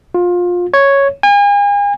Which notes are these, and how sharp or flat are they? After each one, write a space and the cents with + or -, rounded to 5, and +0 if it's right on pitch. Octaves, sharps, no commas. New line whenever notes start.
F4 +20
C#5 +0
G#5 -40